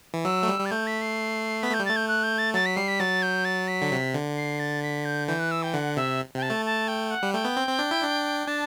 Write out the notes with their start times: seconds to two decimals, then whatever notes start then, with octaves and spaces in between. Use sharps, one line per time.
0.14 E3
0.25 F#3 E6
0.43 A3
0.48 G3
0.59 G3
0.66 A6
0.71 A3 G6
0.87 B6
1.01 C7
1.62 B3 B6
1.71 A3 G6
1.80 G3
1.85 A3 A6
1.96 G6
2.08 F#6
2.23 G6
2.38 A6
2.54 F#3 A6
2.66 B6
2.76 G3 C7
2.88 B6
3.00 F#3 A6
3.23 G6
3.45 A6
3.68 B6
3.82 D3
3.92 C3
4.13 D3
4.37 C7
4.59 A6
4.83 B6
5.05 G6
5.28 E3 G6
5.39 F#6
5.51 E6
5.63 G5
5.74 D3 F#5
5.97 C3 E5
6.35 C3 G5
6.42 A5
6.50 A3
6.66 A5
6.88 G5
7.11 F#5
7.23 G3
7.33 A3 G5
7.45 B3
7.57 C4
7.68 C4
7.79 D4
7.91 E4
8.03 D4
8.47 D4 A5